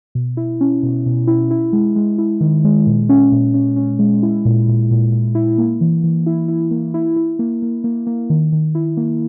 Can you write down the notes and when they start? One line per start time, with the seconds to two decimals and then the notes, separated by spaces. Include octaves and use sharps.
0.15 B2
0.37 E4
0.61 C#4
0.83 B2
1.06 B2
1.27 E4
1.51 E4
1.73 G#3
1.96 G#3
2.18 E4
2.41 D#3
2.64 G#3
2.87 A#2
3.09 C#4
3.32 A#2
3.54 C#4
3.76 C#4
3.99 G#3
4.23 E4
4.45 A#2
4.68 A#2
4.91 A#2
5.12 A#2
5.35 E4
5.58 A#3
5.81 E3
6.04 E3
6.27 E4
6.48 E4
6.71 A#3
6.94 E4
7.16 E4
7.39 A#3
7.62 A#3
7.84 A#3
8.07 A#3
8.30 D#3
8.53 D#3
8.75 E4
8.97 A#3